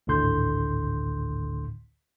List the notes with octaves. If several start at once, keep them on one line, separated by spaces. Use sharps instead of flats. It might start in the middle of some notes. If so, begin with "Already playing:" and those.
G#1 D2 A2 D3 C6 G6